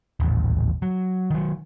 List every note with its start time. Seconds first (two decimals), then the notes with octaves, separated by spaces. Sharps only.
0.20 D#1 A1
0.82 F#3
1.31 D#3 F#3